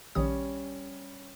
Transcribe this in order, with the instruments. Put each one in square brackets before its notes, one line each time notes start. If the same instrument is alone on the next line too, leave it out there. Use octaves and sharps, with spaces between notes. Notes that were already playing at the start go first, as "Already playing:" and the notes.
[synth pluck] A#1 D#3 D#6 [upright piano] G3 C#4